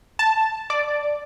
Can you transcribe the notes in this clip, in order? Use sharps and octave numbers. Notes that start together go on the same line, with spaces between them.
A5
D5